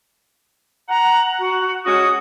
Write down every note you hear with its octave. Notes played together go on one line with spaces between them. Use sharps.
F#5 A#5
F#4
G#3 C#4 F#4 D#6